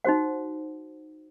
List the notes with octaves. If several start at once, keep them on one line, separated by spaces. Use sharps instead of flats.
D#4 F#4 C5 F#5